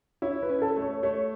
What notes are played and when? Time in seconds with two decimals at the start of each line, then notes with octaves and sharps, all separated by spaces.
0.22 E4 C#5
0.43 B4
0.49 C#4
0.62 A4
0.76 A3
0.82 C#5
1.03 A3 C#5